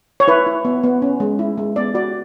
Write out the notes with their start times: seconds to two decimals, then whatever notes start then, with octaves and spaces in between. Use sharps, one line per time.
0.20 C#5
0.28 E4 B4
0.46 E4
0.65 B3
0.83 B3
1.02 C#4
1.20 G#3
1.39 E4
1.58 G#3
1.76 B3 D5
1.94 F#4 D5